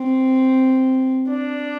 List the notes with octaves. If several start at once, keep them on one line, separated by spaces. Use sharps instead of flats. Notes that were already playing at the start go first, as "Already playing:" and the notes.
Already playing: C4
D4